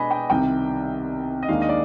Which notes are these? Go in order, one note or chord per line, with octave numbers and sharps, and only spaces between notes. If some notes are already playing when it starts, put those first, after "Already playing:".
Already playing: B2 G#3 B3 D4 D#5 G#5 B5
G5
C2 C3 D#3 G3 G5
D#5
D#2 D#3 G#3 D4 F5
D#5
D5